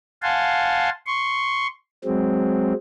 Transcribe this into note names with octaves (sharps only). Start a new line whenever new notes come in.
F5 F#5 G#5 A5 C6
C6 C#6
F#3 G#3 C4